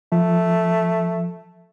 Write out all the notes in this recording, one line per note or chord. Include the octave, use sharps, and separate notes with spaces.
F3 A3